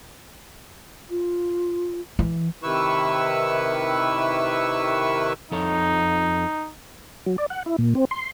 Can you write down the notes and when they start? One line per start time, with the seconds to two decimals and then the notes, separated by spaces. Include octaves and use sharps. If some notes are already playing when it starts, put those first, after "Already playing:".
1.10 F4
2.19 E3
2.63 C3 D#3 E4 B4 C#6 E6
5.52 F2 D#4 A4 C#5
7.26 F#3
7.38 D5
7.50 F#5
7.66 E4
7.78 A#2
7.95 C4
8.11 C6